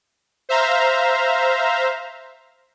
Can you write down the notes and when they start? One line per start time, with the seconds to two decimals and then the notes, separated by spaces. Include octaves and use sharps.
0.49 C5 E5 F5 A#5